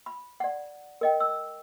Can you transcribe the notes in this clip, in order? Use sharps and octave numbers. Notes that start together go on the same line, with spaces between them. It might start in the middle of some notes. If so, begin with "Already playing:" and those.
B5
D5 F#5
A#4 D#5 G5
E6